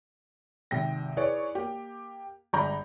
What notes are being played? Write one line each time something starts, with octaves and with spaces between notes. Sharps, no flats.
G#1 C3 G5 A#6
E4 G#4 B4 C#5 D5
A#3 G4
G1 G#3 D5 A#5 B5 G6